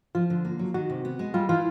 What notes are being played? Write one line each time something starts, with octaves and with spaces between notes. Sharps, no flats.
F3 F4
D3
A#3
F#3
D#3 F#4
C3
B3
G#3
G3 F4
E3 F4